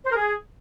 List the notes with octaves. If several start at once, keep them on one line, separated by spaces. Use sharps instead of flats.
C5
A#4
G#4